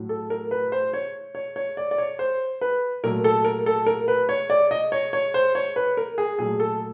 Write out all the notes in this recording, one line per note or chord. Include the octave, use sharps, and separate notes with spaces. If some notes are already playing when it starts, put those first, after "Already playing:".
Already playing: A2 F#3 A3
A4
A#4
B4
C5
C#5
C#5
C#5
D5
D5
C#5
C5
B4
A#2 F#3 A3 A#4
A4
A#4
A4
A#4
B4
C#5
D5
D#5
C#5
C#5
C5
C#5
B4
A#4
G#4
A#2 F#3 A3 G#4
A4